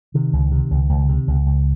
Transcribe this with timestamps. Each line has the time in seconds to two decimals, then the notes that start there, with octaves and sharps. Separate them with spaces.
0.14 C3 D#3
0.33 C#2
0.51 C3
0.71 C#2
0.89 C#2
1.09 C3
1.28 C#2
1.46 C#2